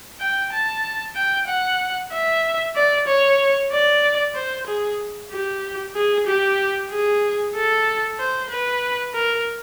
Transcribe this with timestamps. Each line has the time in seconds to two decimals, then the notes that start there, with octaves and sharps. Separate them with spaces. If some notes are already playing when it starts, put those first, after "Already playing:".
0.20 G5
0.53 A5
1.16 G5
1.47 F#5
2.13 E5
2.76 D5
3.08 C#5
3.72 D5
4.35 C5
4.67 G#4
5.32 G4
5.96 G#4
6.27 G4
6.90 G#4
7.55 A4
8.19 C5
8.51 B4
9.15 A#4